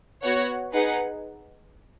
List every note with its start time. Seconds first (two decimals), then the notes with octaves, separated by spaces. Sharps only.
0.22 B3 F#4 C#5 F#5
0.72 D#4 G#4 B4 F#5